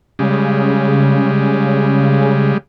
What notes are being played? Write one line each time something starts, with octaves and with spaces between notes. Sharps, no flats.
C#3 G3 G#3